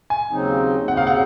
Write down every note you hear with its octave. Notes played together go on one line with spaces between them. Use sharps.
G#5
D#2 C#3 F#3 C4 D#4
D#2 C#3 F#3 C4 D#4 F#5
F5
F#5